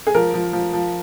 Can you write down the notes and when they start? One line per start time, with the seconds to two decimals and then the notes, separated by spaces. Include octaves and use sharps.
0.07 G#4
0.14 F3 A#4
0.34 F3
0.53 F3
0.73 F3